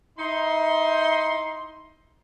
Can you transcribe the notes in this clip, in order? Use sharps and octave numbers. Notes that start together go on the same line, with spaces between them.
D#4 E4 C6